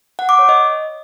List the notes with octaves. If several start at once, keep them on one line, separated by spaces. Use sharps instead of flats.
F#5
D6
C#5
D#5